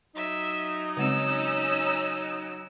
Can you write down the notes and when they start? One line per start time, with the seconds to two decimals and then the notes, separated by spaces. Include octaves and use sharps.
0.15 F#3 D#4 E5
0.97 C#3 G#3 C4 C#4 E6
1.86 A#5